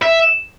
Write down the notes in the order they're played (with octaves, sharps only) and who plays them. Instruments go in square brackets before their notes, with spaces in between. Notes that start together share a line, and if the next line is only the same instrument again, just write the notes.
[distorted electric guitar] E5